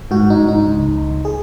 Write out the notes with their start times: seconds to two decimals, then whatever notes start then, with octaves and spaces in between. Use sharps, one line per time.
0.11 G#2 F#4
0.30 D#4
0.39 G#2
0.48 D#4
0.67 C#2
0.96 C#2
1.25 G#4